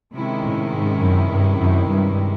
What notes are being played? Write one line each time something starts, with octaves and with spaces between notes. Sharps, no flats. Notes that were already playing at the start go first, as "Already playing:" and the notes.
C3 D#3 G#3 C#4 E4
A2
G#2
F#2
G2
F#2
G2